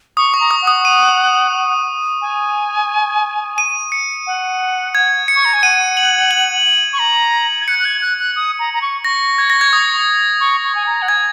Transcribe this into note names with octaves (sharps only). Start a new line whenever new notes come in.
C#6 D#6
C#6
A#5
D#6
F#5
D#6
D#7
G#5
D#7
C#7
F#5
G#6
C#7
C#6
A#5
G#5
F#5 D#7
F#7
F#7
C#6
A#5
G#6
F#6 C#7
F#6
G#6
F#6
F#6
D#6
A#5
A#5
C#6
C#6 A#6
G#6
A#6
G#6
D#6
C#6
C#6
G#5
A#5
F#5
G#5 G#6